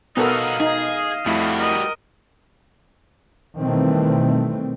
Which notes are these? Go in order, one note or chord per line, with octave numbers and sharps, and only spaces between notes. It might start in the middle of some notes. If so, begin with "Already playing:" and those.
B2 B3 D#4 F#4 A4 A#4 D#5 F5
D#4 G#4
F2 G3 A3 E4 F#4
A#4 D#5
B2 D#3 E3 G3 A3 C4